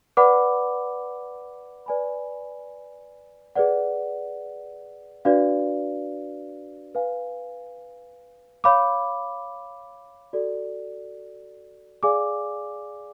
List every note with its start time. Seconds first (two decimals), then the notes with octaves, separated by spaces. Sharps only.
0.17 B4 D5 F#5 B5 D6
1.86 B4 D5 G#5 B5
3.55 G#4 B4 D5 F#5
5.25 D4 F#4 B4 D5 F5
6.95 B4 F5 G#5
8.64 C#5 F5 B5 D6
10.33 F#4 A4 D5
12.03 G#4 D5 F5 G#5 D6